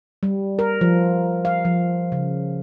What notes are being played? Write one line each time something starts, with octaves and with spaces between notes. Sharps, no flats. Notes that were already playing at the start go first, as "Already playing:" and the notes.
G3
A#4
F3
F5
F3
C#3